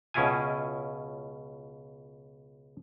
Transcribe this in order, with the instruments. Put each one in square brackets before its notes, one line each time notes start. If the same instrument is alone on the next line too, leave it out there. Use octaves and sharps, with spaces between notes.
[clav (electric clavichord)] C#2 B2 C#4 E4 F4 G#5